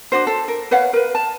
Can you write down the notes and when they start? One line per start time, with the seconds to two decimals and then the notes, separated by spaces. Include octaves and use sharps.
0.12 D4 F#4 C5
0.27 A4
0.48 A#4
0.71 B4 C#5 F5 F#5
0.93 A#4 B4
1.15 A5